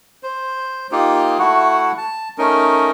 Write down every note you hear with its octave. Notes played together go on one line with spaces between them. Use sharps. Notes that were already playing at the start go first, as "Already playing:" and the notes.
C5
A#3 D#4 F4 G4
A3 E4 F#4 F#5
A5
A3 C#4 D#4 A#4